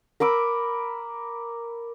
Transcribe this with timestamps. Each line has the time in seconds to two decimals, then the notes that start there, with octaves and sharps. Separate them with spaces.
0.20 A#4 B5 D6 E6